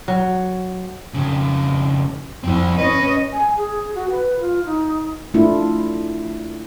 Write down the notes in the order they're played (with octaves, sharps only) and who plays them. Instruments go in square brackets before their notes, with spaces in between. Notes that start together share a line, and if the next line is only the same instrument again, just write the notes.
[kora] F#3
[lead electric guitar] F2 C#3
[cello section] F2 [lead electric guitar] C4 E4
[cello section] C#4 D#5 [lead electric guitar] B4
[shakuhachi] G#5
G#4
F#4
B4
F4
D#4
[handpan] A3 D4 E4 F4